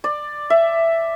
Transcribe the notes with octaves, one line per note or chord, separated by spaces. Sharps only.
D5
E5